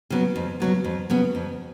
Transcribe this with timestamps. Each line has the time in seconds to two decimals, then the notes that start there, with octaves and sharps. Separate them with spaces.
0.10 C#3 F#3 B3
0.36 F2
0.60 C#3 F#3 B3
0.84 F2
1.10 C#3 F#3 B3
1.35 F2